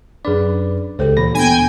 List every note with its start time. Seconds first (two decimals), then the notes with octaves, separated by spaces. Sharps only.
0.25 F#2 D4 G#4 B4 D5
0.99 C#2 G#3 G4 A4 B4 C5
1.17 D2 A#2 E3 B5 A#6
1.35 B3 D4 G5 G#5